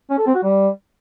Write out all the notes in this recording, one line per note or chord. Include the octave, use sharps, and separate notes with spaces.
C#4
A4
C4
F#4
G3